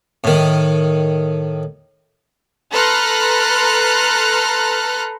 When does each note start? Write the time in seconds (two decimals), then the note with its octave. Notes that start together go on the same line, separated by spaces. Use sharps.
0.24 A2 D#3
2.72 A4 B4 A#5 C6 F6 F#6